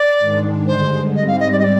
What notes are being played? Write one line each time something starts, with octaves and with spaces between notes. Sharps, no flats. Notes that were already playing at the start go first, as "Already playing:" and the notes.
Already playing: D5
G#2 D#3 G#3 D4
G2 D3 G#3 C5
G#2 G3 C4 D#5
F5
D#5
D5
D#5
D5